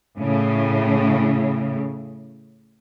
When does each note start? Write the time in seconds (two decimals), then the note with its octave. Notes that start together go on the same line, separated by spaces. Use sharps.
0.18 A2 C#3